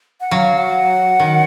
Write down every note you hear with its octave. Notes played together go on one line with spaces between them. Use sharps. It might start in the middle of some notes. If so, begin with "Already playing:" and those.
F#5
F#3 F5
F#5
D#3